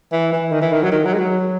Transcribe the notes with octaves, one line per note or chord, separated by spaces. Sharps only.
E3
E3
D#3
E3
D#3
F#3
D#3
F#3
G#3
F#3